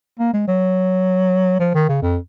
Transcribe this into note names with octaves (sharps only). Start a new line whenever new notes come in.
A#3
G#3
F#3
F3
D#3
C#3
F2